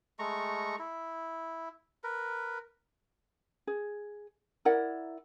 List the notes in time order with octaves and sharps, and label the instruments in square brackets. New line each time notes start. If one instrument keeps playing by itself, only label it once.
[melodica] G#3 A3 A#5 C#6
E4
A#4 B4
[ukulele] G#4
E4 A#4 D5 F#5